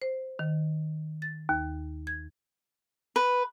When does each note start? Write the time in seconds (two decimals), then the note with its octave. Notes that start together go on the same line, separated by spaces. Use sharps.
0.02 C5
0.39 D#3
1.22 A6
1.49 D#2
2.07 G#6
3.16 B4